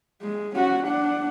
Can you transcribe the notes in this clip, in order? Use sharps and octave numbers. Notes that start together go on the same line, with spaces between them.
G#3
C#4 F#4
D4 F#5